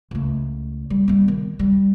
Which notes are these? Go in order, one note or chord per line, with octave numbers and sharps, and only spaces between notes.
C#2 A3
G3
G3 B3
D#3
G3